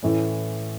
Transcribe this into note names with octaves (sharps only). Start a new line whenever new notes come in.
A2 E3 A3 C#4 E4